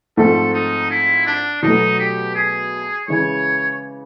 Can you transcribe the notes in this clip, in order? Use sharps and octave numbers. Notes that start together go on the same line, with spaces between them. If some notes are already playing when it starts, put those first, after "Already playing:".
G#2 F3 A3 C4 A4
D#4
E4
D4
B2 F#3 A3 D#4
G4
G#4
C#3 E3 G#3 C#5